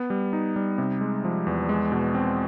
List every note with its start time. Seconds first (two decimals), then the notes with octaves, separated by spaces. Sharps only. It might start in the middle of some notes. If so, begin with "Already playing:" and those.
Already playing: B3
0.10 G3
0.33 D#4
0.56 G3
0.78 C3
1.01 G#3
1.24 F3
1.47 E2
1.69 G#3
1.92 B2
2.15 C4